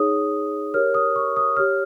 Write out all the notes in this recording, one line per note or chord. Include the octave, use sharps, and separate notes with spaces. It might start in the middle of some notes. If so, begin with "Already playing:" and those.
Already playing: D#4 G#4 C#5 D#6
G4 A#4 C#5 F6
D#6
C#6
D#6
G4 C#5 F6